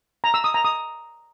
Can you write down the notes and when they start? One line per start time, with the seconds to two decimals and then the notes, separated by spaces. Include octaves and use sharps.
0.24 A#5
0.34 E6
0.44 D#6
0.54 A#5
0.65 D#6